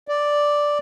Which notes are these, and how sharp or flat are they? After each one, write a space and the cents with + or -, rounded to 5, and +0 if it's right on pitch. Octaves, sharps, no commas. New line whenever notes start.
D5 +0